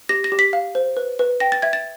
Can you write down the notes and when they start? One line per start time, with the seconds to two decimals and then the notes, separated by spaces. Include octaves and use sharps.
0.09 G4 A#6
0.24 A#6
0.32 G4
0.39 B6
0.53 F5
0.75 C5
0.97 B4
1.19 B4
1.40 G5 A#6
1.52 A6
1.62 E5 G#6
1.73 A6